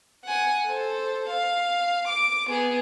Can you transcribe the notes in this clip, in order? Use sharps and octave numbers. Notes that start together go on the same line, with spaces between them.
F#5 G#5
A4 C5
F5
D6
B3 G#4